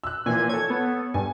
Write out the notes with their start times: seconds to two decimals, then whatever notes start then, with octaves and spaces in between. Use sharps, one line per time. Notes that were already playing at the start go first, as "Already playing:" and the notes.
0.04 E6 F#6
0.26 A#2 E3 F3 G#5
0.49 A4 C#5 G#6
0.70 B3
1.14 G2 G#5